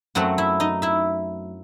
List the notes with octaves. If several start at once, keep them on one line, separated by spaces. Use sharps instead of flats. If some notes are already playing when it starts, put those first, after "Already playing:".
F#2 F#3 A3 C4 F#4 F#5
E4 E5
D#4 D#5
E4 E5